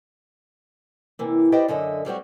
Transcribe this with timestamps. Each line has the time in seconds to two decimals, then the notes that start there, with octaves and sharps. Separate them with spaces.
1.19 C3 E3 A#3
1.52 G4 B4 C5 D5 D#5 G5
1.68 F#2 D3 D#5 E5
2.05 F#3 G3 C4 F#4